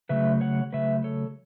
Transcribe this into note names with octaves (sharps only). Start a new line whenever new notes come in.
C#3 F#3 A3 B4 E5
C#5 F#5
C#3 F#3 A3 B4 E5
A4 C#5